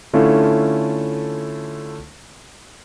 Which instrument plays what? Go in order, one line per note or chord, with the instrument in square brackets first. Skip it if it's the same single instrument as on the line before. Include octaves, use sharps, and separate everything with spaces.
[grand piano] D3 A3 C#4 E4 F4 A4